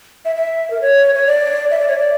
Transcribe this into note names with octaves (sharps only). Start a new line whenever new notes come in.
E5
E5
A#4
C#5
C#5
D5
E5
D5
C#5
D5